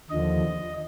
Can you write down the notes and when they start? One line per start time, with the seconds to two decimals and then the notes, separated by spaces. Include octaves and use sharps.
0.10 D#2 D3 F3 D#5